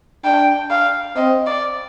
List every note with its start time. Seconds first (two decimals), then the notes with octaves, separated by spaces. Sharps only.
0.24 D4 G5
0.70 F5
1.16 C4 D#5
1.46 D5